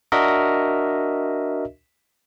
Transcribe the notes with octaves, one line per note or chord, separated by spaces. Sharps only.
D4 F#4 A#4 D#5 E5